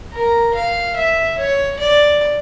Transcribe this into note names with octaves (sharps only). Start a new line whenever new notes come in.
A#4
F5
E5
C#5
D5